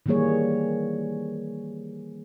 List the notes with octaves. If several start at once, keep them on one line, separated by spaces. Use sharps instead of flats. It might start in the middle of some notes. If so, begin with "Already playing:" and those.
D#3 E3 G3 A#3 G#4 C#5